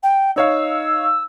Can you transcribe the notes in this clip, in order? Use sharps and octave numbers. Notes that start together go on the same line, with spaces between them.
G5
D#4 C#5 F5 E6